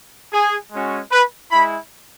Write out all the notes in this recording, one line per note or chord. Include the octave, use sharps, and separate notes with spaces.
G#4
G#3 C#4 F#4
B4
G#3 E4 B5